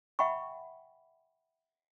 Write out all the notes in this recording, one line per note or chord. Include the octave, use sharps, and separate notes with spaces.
E5 F#5 G5 B5 C#6